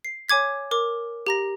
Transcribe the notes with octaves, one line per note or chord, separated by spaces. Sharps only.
C7
C#5 G#5 D6 G#6 B6
A#4 D6
G4 A#5 A#6